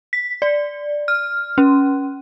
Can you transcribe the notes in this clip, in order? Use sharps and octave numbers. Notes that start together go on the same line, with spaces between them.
B6
D5
F6
C#4